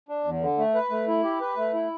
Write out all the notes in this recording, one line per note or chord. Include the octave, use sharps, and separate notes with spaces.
D4
E2
D3
A3
B4
A3
E4
G4
B4
A3
E4